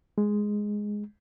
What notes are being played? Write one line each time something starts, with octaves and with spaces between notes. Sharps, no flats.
G#3